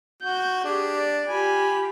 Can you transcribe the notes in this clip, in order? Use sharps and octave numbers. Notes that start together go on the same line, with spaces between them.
F#4 G6
D4 G4 G#4
D5
F4 G4 G#5 B5